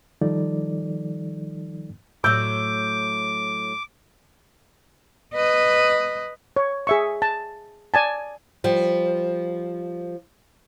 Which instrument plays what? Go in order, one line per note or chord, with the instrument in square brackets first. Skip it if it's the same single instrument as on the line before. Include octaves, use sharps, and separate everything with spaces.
[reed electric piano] D#3 F3 G3 D#4 A4 D5
[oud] A2 F#3 [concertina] D6 [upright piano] E6 G6
[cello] B4 D#5
[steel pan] C#5
G#4 E5 C#6
A5
D5 G#5 A5
[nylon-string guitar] F3 G3